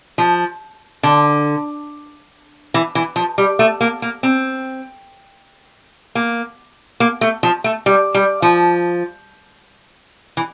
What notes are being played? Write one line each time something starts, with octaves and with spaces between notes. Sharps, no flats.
F3
D3
E3
E3
F3
G3
A3
A#3
A#3
C4
A#3
A#3
A3
F3
A3
G3
G3
F3
E3